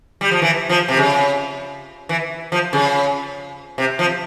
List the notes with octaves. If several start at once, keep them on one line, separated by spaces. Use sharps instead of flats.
G3
F3
E3
F3
C3
C#3
E3
F3
C#3
C3
F3